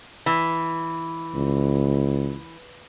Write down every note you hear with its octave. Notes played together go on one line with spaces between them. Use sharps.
E3
C#2